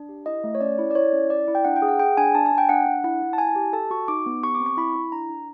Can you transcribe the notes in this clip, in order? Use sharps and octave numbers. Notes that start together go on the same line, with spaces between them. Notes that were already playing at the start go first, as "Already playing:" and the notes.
Already playing: D4
G4
E4 D#5
A3
C#5
C#4 D5
E4
D5
E4 C#5
C#4
E4 D5
E4
G5
D4 F#5
G5
G#4
F#5
G#4 G5
D4 G#5
D4 A5
G#5
D4
G5
D4 F#5
D4
E4 F#5
E4
A5
E4 G#5
G4
A4 A5
F#4 C#6
D#4 D6
B3
G4 C#6
D6
C4
C#6
E4 B5
E4
D4 A#5
D4